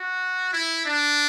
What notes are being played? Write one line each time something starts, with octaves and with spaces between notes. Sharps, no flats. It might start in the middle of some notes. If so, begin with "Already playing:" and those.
Already playing: F#4
E4
D4